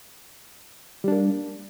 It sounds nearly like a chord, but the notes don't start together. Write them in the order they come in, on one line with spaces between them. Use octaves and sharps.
G3 D4 A#3